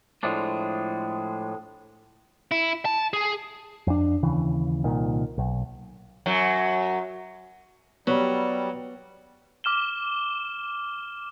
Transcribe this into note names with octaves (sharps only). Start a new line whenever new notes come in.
A2 F3 G#3 D4
E4
A5
G#4
F2 D4
D#2 C#3 E3
C2 A#2 D#3
B1
F#2 F#3
F#3 G3 B3
D6 F6 E7 G7